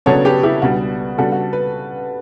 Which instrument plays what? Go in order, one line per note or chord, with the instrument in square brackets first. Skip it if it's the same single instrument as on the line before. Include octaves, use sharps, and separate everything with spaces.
[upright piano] C#3 F#3 B3 D4 A4 C#5
G4 B4
E4 G4
C#2 B2 G3 D4 F#4
C#3 G3 B3 D4 F#4 A4
F#4
B4